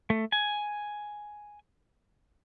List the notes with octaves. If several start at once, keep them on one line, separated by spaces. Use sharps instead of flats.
A3
G#5